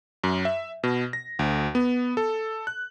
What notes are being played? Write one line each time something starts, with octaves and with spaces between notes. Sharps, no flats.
F#2
E5
B2
A#6
D2
B3
A4
F#6